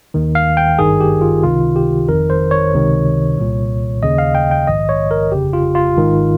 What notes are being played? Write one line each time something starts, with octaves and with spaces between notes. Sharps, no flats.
D#2 D#3
F5
G5
G#1 G2 D#3 G#4
G4
F4
C#2 C3 D#3 F4
G4
G1 F2 D#3 A#4
C5
C#5
C#2 C3 D#3
C2 A#2
D#2 C#3 D#5
F5
G5
G5
A#1 G#2 D#3 D#5
C#5
A#4
G1 F2 C#3 G4
F4
F4
G#1 G#2 D#3